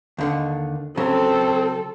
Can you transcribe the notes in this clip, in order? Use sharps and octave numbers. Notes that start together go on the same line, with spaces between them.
D#2 D3 D#3
C#3 F#3 C4 A4